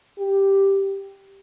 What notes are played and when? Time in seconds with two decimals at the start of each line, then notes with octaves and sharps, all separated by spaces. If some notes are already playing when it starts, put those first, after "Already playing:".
0.18 G4